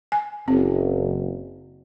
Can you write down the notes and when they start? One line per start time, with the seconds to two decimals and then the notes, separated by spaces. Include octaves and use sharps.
0.12 G#5
0.48 F#1 C4